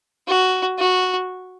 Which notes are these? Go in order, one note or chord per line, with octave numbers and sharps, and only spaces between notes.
F#4
F#4